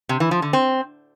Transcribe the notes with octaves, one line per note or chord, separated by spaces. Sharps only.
C3
E3
F3
D3
C4